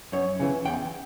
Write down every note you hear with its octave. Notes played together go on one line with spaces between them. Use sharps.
F#2 C#5
C#3 E3
E2 G5